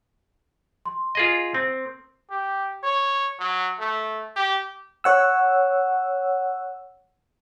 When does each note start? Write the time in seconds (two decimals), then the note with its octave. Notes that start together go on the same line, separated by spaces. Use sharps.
0.86 C6
1.15 F4 G#4 D#5
1.54 C4
2.30 G4
2.84 C#5
3.39 F#3
3.79 A3
4.36 G4
5.04 C#5 F#5 E6